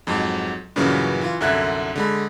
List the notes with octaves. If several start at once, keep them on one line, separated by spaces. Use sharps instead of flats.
F2 G#2 F#3
G2 A#2 C#3 E3 F#3 C#4
E3 F4
C2 F#2 D3 E5 F#6 G#6
D3 G#3 B5